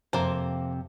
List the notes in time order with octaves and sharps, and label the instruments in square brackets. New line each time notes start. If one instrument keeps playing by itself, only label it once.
[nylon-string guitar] F2 C3 A5 [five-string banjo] A#3 C5